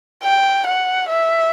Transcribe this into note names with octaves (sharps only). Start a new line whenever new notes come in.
G5
F#5
E5